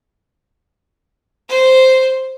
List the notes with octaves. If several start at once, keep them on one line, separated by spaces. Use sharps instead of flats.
C5